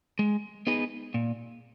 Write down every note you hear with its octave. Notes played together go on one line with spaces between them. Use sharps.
G#3
B3 D#4 G#4 B4
A#2